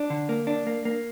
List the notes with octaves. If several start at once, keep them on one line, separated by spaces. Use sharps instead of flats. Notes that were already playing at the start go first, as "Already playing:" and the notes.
Already playing: D4
D3
A#3
D4
A#3
A#3